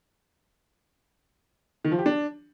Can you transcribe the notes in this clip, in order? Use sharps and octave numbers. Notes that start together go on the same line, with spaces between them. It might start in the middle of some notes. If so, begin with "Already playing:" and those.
D#3
F3
G4
D4